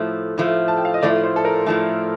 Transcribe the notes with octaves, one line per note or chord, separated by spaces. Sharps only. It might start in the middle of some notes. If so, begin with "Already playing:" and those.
Already playing: A2 F3 A3
A2 F3 A3
A5
G5
F5
D#5
A2 F3 A3 D5
C5
A4
A#4
A2 F3 A3 A4